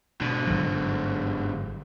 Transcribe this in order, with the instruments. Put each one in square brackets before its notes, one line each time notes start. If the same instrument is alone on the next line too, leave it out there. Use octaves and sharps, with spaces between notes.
[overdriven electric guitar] G#2 D3 [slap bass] B2
[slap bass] G1 F#3